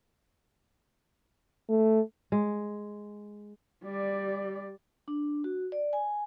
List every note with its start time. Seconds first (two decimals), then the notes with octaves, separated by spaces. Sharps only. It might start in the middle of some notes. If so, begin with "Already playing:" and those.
1.69 A3
2.32 G#3
3.84 G3 D5
5.08 D4
5.44 F#4
5.72 D5
5.93 G#5